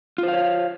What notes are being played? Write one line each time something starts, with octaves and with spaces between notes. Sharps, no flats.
F4 C5 C#5 F5